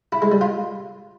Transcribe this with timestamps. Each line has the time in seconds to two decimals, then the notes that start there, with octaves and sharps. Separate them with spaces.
0.12 E4
0.22 G#3
0.32 G3
0.41 F4